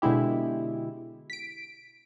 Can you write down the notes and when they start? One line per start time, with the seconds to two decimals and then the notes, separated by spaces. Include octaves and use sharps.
0.02 B2 D3 G#3 E4 G4
1.30 B6 D7